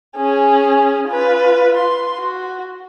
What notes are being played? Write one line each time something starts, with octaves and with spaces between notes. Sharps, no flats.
C#4 G#4
F4 B4
C6
F#4